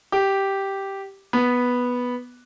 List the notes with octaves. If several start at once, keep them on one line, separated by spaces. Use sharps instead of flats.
G4
B3